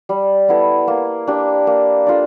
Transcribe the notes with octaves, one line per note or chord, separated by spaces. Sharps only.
G3
B3 E4 A4
A#3
D4 G4
A#3
D4 F4 A4